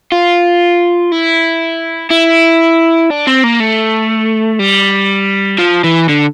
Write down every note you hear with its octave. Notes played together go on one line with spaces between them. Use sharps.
F4
E4
E4
D4
C4
A#3
A3
G3
F3
E3
D3